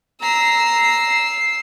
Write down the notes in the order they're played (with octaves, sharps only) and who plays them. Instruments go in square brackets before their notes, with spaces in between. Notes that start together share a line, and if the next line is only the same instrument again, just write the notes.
[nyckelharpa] A#5 [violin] E6 C7